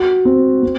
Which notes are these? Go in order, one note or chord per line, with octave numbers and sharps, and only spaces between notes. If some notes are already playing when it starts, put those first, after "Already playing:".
Already playing: F#4
C4
C4